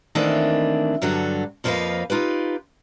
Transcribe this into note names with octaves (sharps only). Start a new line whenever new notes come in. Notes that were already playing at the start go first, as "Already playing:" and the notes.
D#3 E3 A3 A#3 C4 D4
G2 D3 F#3 F#4 A4
F2 F3 A#3 B4 D#5 F5
D#4 F4 G4 B4